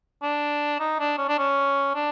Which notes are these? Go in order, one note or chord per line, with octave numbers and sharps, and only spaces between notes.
D4
D#4
D4
C#4
D4
C#4
D4